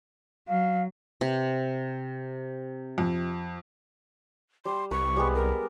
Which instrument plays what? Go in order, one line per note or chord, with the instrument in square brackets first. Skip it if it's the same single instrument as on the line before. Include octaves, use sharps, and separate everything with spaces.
[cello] F#3 [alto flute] F5
[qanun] C3
[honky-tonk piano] F2
[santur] G3 [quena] C6
[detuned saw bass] C2 [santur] B4 [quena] C#6
[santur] G3 G#3 B3
[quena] A#4